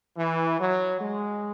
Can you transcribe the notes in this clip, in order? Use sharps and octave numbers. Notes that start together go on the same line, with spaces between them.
E3
F#3
G#3